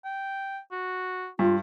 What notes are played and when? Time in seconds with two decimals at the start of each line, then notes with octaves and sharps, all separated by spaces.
0.05 G5
0.72 F#4
1.39 G2 F4